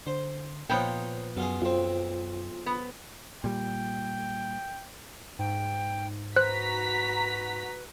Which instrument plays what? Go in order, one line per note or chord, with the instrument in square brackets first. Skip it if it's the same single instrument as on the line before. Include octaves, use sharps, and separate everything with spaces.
[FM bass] D3 [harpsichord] C5
[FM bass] A#2 [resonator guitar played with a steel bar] F3 B3 G5 [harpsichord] D#4 C5 C#5
[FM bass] F#2 [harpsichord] B2 F4 G#4
[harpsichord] B1 C4 [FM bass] F#2 [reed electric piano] F4 C5
[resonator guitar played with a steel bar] B3
[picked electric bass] A#2 G3 [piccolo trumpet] G5
[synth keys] G#2 [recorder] G5
[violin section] F#4 A#5 B6 [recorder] B4 [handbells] C5 F#6